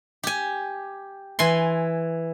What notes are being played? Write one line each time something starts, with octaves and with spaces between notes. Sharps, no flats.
G4 G#5
E3 G#5 C6